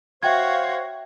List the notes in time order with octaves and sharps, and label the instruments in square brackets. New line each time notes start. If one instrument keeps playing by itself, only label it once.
[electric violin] F#4 C#5 [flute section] C5 F5 [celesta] E5 G5 G#6